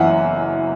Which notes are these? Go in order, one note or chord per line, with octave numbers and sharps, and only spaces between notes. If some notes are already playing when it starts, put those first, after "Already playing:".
Already playing: F#1 F#2 E3 E5 F#5 G#5